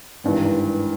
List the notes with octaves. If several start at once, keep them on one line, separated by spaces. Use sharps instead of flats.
G#1 G2 E3